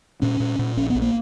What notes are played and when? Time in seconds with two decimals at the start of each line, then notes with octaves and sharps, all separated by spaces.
0.22 A#2 C#4
0.40 A#2
0.59 A#2
0.77 A#1 C#4
0.90 B3
0.95 A#1
1.02 A#3